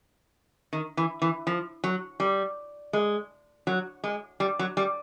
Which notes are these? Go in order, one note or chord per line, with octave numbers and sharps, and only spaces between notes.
D#3
E3
E3
F3
F#3
G3
G#3
F#3
G#3
G3
F#3
G3